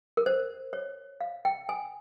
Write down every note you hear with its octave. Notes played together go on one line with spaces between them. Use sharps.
A#4
C5
C#5
F5
G5
G#5